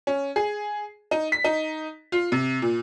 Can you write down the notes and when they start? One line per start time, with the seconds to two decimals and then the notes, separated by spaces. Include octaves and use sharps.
0.07 C#4
0.36 G#4
1.11 D#4
1.32 B6
1.44 D#4
2.12 F4
2.32 C3
2.62 A#2